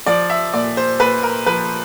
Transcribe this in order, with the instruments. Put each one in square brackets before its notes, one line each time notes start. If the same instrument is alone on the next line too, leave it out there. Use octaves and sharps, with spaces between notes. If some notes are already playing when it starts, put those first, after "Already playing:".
[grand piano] F3 D5
E5
A#2 D5
C5
A#2 B4
A#4
F3 B4